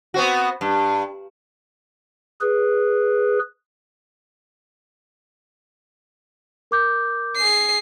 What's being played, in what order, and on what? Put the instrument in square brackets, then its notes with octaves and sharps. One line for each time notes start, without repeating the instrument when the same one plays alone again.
[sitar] B3 C4 F#4
G2
[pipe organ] G#4 B4
[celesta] A#4 D6 G6
[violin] G#4 C7